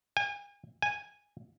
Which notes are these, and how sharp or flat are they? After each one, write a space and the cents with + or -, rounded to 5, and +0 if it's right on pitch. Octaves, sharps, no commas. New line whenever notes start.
G#5 -40
G#5 -15